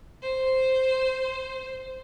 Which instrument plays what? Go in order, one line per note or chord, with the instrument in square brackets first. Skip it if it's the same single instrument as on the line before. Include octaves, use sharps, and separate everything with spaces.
[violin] C5